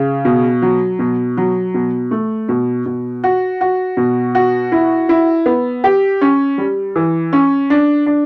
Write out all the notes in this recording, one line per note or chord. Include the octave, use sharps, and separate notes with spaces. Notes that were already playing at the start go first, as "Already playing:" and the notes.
Already playing: C#3
B2
F#3
B2
F#3
B2
A3
B2
B2
F#4
F#4
B2
F#4
E4
E4
B3
G4
C#4
G3
E3
C#4
D4
D4